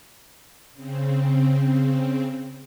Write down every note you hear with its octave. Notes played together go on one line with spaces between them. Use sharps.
C#3 C4